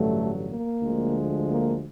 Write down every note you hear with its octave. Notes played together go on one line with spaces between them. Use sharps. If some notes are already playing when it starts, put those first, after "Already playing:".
Already playing: A1 G2 D3 F#3 A3
A#3
D2 D3 F3 G#3
A#3